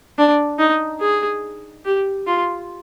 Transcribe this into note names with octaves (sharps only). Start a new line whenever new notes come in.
D4
D#4
G#4
G4
F4